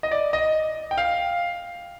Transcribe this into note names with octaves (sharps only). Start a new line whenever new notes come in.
D#5
D5
D#5
G5
F5